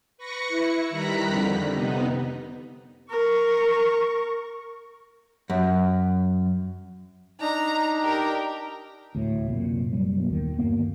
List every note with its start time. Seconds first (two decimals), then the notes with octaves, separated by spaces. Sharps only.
0.17 B4 C#6 A#6 C#7
0.48 E4
0.90 D#3 G3 A#5 B5 F#6 B6
1.26 F2 D3 D#3 G3
1.73 C3 B3 D#4
3.10 A#4 C#6
5.50 F#2
7.41 D4 D#4 A#5
8.02 G4 A#4
9.15 D2 A2
9.48 C2 F#2 A#2
9.93 F#1 F#3 G3
10.17 B2 E3 A#3
10.30 D#2 D#3
10.59 D2 G2 A#3 B3